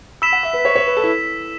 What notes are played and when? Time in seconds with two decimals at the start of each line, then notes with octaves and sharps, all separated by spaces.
0.22 B5 E6 B6 E7
0.32 F#5
0.43 E5
0.53 B4
0.65 C#5
0.76 C#5
0.87 B4
0.97 A4
1.03 E4